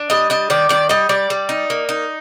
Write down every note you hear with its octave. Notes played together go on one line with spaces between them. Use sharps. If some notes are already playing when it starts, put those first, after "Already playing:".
Already playing: D4
G3 D#5
D4 D#5
D#3 D5
D#3 D5
G3 D#5
G3 D5
G3
D#4
A#3
D#4